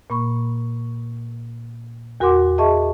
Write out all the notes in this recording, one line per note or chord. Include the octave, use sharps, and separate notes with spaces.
A#2 A#3 B5 C#6
E2 F#4 A#4 F#5 C6 D6
G#4 D#5 E5 A5 C#6